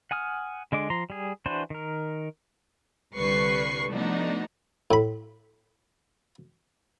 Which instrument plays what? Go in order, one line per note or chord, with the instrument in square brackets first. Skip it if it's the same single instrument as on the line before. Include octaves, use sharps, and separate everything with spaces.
[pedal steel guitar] F#5 G#5 D#6 F6
D3 G#3 D4 D6
F3 A#5 C6
G3 G#4
E3 D4 F#4 B4 C5
D#3 A#4
[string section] C2 D3 G3 B4 C#6 C7
F3 A3 B3 D4 D#4 F#4
[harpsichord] A2 B5